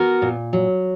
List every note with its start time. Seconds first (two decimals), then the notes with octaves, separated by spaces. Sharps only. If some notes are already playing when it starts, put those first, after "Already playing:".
Already playing: B3 F#4 A#4
0.22 A#2
0.53 F#3